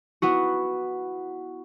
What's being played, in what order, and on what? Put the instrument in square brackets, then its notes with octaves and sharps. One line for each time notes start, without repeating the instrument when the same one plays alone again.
[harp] B3 E4 F#4